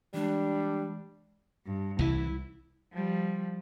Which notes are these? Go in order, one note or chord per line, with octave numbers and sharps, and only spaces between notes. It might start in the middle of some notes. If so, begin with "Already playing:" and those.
E3 G3 G#3 D4
G2
C2 E3 E4
F3 G3